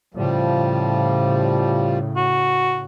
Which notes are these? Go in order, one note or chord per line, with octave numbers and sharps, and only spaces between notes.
A2 C#3 F3 G3
F#4